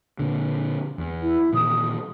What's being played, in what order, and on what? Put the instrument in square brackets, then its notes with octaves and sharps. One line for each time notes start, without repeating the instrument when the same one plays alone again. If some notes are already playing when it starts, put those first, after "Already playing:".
[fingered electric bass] A#2 D3
E2
[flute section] E4
[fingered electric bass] A#2 D#3 E3 [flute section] D#6